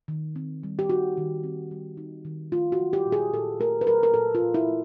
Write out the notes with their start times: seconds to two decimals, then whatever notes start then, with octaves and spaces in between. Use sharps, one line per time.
0.08 D#3
0.36 C4
0.63 G3
0.79 G4
0.89 D#4 F#4
1.17 D#3
1.44 C4
1.71 G3
1.97 D#4
2.25 D#3
2.52 A3 F4
2.72 F#4
2.79 F#3
2.93 G4
3.06 A#2
3.12 G#4
3.33 A#2 A4
3.60 A3 A#4
3.81 B4
3.87 F#3 A#4
4.03 A#4
4.14 A#2 A4
4.35 F4
4.41 A#2
4.54 E4
4.68 A3